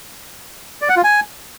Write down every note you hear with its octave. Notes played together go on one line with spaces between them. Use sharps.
D5
F#5
F4
G#5